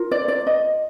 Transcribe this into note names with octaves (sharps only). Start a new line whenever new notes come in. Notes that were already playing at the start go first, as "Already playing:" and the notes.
Already playing: F4 A#4
D5
D5
D#5